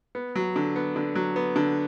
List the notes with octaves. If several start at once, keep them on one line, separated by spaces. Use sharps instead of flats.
B3
F#3
D3
B3
D3
F#3
B3
D3